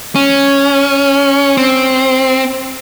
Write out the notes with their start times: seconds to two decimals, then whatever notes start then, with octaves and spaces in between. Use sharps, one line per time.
0.15 C#4
1.57 C4